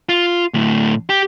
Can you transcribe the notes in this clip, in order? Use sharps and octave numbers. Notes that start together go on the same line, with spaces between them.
F4
D2 A2
G4